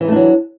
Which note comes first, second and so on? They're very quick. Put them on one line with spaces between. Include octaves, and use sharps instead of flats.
E3 D#4 A3 D4 F#3